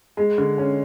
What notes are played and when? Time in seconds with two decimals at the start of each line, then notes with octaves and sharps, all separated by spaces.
0.17 G#3
0.38 D3
0.58 C#4